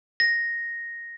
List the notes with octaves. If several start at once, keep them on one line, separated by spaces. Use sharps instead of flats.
A#6